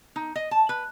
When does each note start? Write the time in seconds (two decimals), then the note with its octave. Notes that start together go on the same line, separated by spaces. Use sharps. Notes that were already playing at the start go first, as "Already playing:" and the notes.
0.16 D#4
0.36 D#5
0.51 A5
0.69 B4